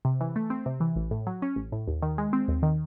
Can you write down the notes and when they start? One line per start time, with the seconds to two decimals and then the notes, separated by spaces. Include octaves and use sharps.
0.05 C3
0.21 E3
0.36 A3
0.50 C4
0.66 C3
0.80 E3
0.96 A1
1.11 A2
1.27 F#3
1.42 C#4
1.56 A1
1.72 A2
1.87 D#2
2.02 D#3
2.18 G#3
2.33 C4
2.48 D#2
2.63 D#3